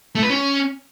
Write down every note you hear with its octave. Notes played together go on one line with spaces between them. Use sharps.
A3
B4
C#4